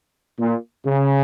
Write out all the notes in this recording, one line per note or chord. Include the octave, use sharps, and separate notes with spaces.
A#2
C#3